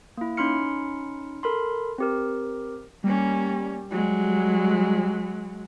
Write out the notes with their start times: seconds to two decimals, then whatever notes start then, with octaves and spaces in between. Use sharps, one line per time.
0.17 A#3 E4
0.37 C#4 D#4 B5 C6 F6 C#7
1.43 A4 A#4 B5 C6
1.98 C4 G4 A#4
3.04 G3 A#3 C#4
3.91 F#3 G#3